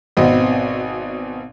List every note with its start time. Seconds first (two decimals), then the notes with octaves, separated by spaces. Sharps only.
0.17 G#1 B2 B3 C4 D#5